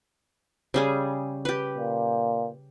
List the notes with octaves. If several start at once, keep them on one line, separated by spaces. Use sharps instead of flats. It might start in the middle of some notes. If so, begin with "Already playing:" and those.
C#3 G3 G#4
G4 B4
A#2